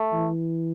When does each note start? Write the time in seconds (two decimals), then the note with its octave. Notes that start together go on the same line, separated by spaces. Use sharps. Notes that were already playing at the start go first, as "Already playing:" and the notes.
Already playing: A3
0.13 E3